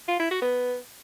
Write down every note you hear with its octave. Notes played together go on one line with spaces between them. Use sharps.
F4
E4
F#4
B3